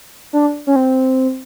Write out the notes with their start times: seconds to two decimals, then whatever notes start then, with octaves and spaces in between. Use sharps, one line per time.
0.33 D4
0.67 C#4
0.76 C4